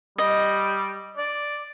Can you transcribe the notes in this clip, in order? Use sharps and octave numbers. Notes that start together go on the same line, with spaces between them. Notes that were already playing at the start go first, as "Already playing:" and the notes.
G3 D#5
D5